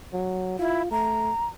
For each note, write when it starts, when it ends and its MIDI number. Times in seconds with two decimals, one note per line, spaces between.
0.13 0.58 54
0.59 0.82 64
0.59 0.91 65
0.91 1.31 57
0.91 1.46 82